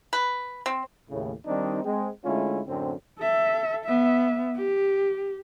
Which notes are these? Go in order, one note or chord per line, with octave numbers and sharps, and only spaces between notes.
B4
C4
D#2 A2 C#3
D#3 G3 C4 D4 D#4
G#3 C4
D3 G#3 A3 C#4 E4 F4
F#2 A2 D3 C4
A4 E5
B3 E5
G4